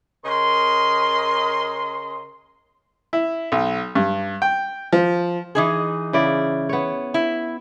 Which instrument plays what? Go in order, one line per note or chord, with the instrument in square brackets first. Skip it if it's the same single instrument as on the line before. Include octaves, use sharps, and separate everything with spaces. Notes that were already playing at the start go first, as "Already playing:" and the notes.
[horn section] C#3 A#4 D#5 C6
[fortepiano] E4
B1
G2
G5
F3
[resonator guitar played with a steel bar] E3 D#4 G#4
[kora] C#3 E4 D5
B3 C#5
[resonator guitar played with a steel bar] E4